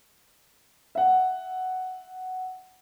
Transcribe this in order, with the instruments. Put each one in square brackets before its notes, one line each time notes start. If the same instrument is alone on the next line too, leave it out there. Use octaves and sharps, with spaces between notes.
[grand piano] E5 F#5